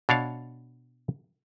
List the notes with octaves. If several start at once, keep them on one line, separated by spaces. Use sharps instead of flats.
B2 D4 C#5 F5